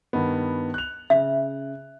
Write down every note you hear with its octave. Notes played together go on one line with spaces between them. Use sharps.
G2 D#3 B3
F#6 F7
C#3 E5